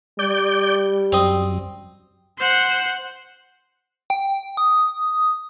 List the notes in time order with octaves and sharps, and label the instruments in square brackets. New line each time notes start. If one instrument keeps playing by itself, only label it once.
[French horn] G3 [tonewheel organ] D5 G6
[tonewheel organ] F#2 [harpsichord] C4 D#5
[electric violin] C5 F#5
[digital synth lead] G5
D#6